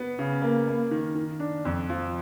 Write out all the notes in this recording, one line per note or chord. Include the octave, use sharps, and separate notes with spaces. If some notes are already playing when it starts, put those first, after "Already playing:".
Already playing: B3
C#3
A#3
A#3
D#3
D#3
D4
F2
F3